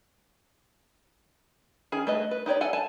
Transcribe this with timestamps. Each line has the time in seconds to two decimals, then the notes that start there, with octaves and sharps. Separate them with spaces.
1.92 D#3 C#4 G#4
2.07 A3 B4 D#5
2.31 B4
2.46 D#4 G4 C#5 D5
2.61 A4 F#5 G#5
2.73 G#5 A5